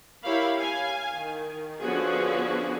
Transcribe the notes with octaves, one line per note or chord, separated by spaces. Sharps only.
E4 G4 A#4 C#5 F5 B5
F5 G#5
D#3
D3 F3 B3 C#4 F#4 G#4